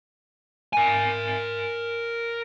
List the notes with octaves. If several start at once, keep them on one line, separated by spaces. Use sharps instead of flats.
A#4 G#5